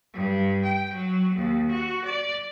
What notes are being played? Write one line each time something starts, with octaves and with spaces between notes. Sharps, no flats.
G2
G5
F#3
D#2
F#4
D5